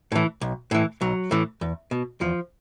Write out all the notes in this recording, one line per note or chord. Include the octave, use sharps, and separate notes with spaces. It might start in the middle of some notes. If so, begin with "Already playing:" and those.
A2 E3
B1
A2 E3
B1 F#3
A2 E3
E2
B2
E2 F3